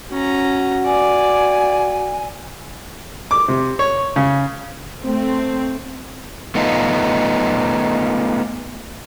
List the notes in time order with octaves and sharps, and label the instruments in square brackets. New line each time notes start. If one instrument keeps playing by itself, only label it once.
[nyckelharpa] C#4 A#5 [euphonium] F#4
[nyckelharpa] D5 [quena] G#5
[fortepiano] D6
C3
C#5
C#3
[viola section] A3 C4
[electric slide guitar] A3 B3 D#4 F4